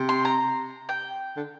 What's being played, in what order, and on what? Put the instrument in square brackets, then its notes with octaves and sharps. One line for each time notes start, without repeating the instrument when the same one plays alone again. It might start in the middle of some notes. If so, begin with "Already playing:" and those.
Already playing: [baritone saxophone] C3
[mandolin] C6
A#5
G5
[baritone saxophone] D3